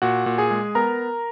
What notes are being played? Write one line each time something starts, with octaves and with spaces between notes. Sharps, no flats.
A#2 F#4 F#5
A#2
G#4 G#5
G#3
B3 A#4 A#5